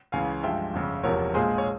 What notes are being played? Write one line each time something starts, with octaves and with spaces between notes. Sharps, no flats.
C#2 C#3 E3 F5 G#5
G2 F3 G#3 E5 G5
G1 F2 C#3
E1 E2 C3 F3 A#4 C#5
A#1 A#2 G#3 G#4 C5
C#5